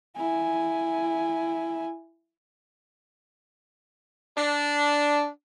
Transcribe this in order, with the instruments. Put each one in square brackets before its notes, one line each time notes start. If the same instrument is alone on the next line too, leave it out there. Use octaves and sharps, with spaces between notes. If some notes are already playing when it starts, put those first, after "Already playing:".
[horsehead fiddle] E4 G#5
[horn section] D4